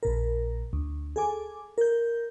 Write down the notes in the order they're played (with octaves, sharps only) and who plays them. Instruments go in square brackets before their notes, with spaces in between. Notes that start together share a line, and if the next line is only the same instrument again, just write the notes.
[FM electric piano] A#1 A#2 A#4
D2
G#4 A4 G#5 D6
A#4 G6